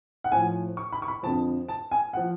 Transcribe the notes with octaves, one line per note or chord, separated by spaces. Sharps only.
F#5
A2 F3 G#5
C#6
B5
C#6
B5
F2 D3 F3 A5
A5
G#5
F3 F#5